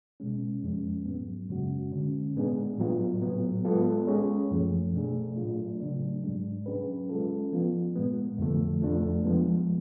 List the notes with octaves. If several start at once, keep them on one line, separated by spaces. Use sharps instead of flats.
B2 G#3 C#4
F2 F3 G#3 C#4
G#2 F#3 B3
F#2 C#3 G#3 C#4 F#4
D3 G#3 C#4
A2 G#3 B3 D4 G#4
A2 F#3 B3 F4
A2 F#3 B3
G#3 B3 F4 A4
G#3 C#4 G#4 C#5
F#2 F3 A3
B2 A3 D4 G#4
A2 F#3 A3 D4 F4
C#3 F#3 A3 D4
G#2 G#3 D4
F#3 C#4 G#4 B4
G#3 C#4 F4 A4
F3 B3 F4
A2 G#3 B3
F2 D3 F3 A3
F2 F3 A3 D4
F3 G#3 B3